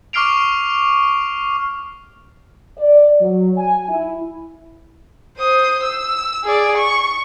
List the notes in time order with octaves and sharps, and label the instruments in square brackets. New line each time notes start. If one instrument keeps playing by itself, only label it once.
[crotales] C#6 D6 F6 C7 D7 F7
[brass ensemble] D5
F#3
G#5
E4
[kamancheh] C5 D#6
E6
G#4 D5
C#6